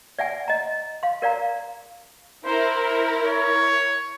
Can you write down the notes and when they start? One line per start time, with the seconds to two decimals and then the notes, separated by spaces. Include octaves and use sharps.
0.19 D5 E5 F#5 G#5
0.48 D#5 A#5
1.03 F5 C6
1.22 A#4 D5 F5 A#5
2.45 E4 A#4 C5
2.75 C5
3.25 C#5